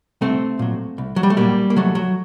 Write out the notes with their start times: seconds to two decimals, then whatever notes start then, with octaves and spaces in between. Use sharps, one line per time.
0.21 C2 A3 C4
0.59 A#2 F#3
0.98 C2
1.16 F#3
1.23 G3
1.30 A3
1.37 A#2 F#3 G3 A#3
1.70 A#3
1.76 C2 F#3 A3
1.95 F#3